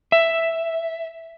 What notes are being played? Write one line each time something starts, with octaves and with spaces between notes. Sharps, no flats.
E5